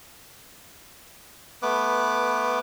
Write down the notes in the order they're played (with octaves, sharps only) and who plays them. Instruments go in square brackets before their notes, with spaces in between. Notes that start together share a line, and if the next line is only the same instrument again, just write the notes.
[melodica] A3 B3 B4 D6